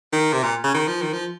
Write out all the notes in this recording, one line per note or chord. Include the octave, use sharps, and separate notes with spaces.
D#3
C3
A#2
C#3
D#3
F3
D#3
F3